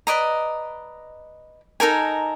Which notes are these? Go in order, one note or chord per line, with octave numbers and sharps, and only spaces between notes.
B4 D5 D#5 A#5
D#4 A4 A#4 G#5